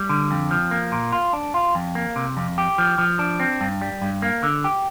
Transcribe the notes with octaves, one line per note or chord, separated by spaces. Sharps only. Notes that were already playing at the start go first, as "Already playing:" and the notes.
Already playing: G3
D3
F2
F3
A#3
A#2
F4
D4
F4
F2
A#3
C3
F2
G4
F3
F3
D4
C4
G2
G3
G2
A#3
D3
G4